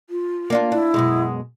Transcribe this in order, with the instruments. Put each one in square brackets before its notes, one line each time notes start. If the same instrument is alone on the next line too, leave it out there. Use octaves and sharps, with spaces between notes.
[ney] F4
[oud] A#3 D4 F4
[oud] D4 [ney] E4
[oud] F#2 B2 G#3